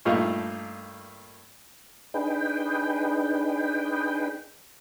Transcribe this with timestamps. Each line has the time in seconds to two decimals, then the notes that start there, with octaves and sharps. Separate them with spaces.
0.05 G2 A#2 A3 D#4 F5
2.14 D4 D#4 G#4 B4 G5